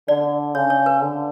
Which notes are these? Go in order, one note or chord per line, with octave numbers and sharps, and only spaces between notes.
D3 D5
C#3 C#5
C#5
B4
D3